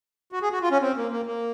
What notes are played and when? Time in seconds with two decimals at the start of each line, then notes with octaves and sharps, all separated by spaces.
0.32 F#4
0.42 G#4
0.52 F#4
0.62 F4
0.71 C#4
0.82 C4
0.97 A#3
1.11 A#3
1.27 A#3